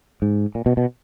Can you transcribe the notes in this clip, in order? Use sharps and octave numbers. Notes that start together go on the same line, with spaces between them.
G#2
A#2
B2
B2